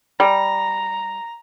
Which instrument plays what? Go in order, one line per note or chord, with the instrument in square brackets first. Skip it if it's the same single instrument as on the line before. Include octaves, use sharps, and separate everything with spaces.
[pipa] G3 [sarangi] A#5